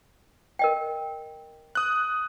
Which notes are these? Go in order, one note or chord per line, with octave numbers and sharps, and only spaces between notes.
A#4 D#5 G5
D#6 F#6